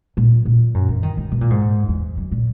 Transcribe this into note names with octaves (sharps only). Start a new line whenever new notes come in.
A#2
A#2
F#2
E3
D#3
D#3
B2
A#2
G#2
E2
F#2
A#2